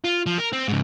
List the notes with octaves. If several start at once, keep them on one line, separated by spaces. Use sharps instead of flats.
F4
F3
A#4
C4
G#2 C#3